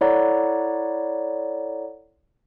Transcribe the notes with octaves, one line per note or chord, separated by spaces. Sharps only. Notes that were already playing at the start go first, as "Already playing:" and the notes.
E4 A4 C#5 D5 F#5 A#5